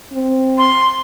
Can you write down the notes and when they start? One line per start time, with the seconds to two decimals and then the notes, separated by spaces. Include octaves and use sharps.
0.12 C4
0.58 C6